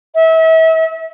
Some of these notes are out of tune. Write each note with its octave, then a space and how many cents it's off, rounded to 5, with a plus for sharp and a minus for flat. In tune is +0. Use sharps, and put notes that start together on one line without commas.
E5 -35